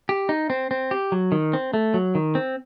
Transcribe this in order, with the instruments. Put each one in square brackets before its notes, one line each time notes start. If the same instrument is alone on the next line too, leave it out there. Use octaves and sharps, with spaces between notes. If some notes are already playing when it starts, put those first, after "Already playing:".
[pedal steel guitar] G4
D#4
C4
C4
G4
F#3
D#3
C4
A3
F#3
D#3
C4